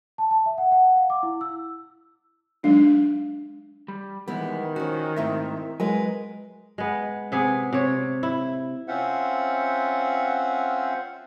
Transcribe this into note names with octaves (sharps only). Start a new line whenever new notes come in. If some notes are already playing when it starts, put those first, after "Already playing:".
A5
A5
E5
F#5
F#5
F5
D6
E4
E6
F#3 G#3 D4 D#4
G3
D#3 E3 G3 G#3 B3
F3 C#4 F#4
G#2 A3 C4 E4 A#4 E5
F#3 G#3 A#4 B4 D#5 G#5
G#3 B3
C3 B3 G#4
C3 C#5
E4
C4 C#4 F4 C5 E5 F#5